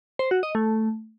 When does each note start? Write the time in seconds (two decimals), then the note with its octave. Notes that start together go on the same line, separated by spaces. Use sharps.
0.19 C5
0.31 F#4
0.43 D#5
0.55 A3